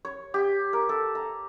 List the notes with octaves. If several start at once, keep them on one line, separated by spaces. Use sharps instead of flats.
C#5
G4
A#4
A4
A#5